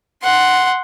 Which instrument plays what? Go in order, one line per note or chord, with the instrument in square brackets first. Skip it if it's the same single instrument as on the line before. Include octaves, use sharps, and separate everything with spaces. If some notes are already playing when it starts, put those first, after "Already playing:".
[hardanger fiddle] F#5 C6